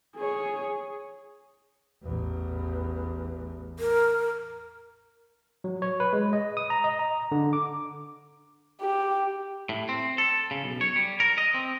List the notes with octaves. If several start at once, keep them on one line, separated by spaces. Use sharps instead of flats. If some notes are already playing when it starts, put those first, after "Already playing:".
G#4 C#5
A1 E2
A#4
F#3
C#5
B4
G#3
D#5
D#6
A#5
D#5
A#5
D3
D6
G4
A2
C4
A4
C#3
B1
C#5
G3
A#4
D#5
C4